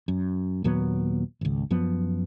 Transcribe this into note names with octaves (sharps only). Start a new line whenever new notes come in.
F#2
D#2 A#2 F#3 B3
G#1 C#2
F#2 F3 B3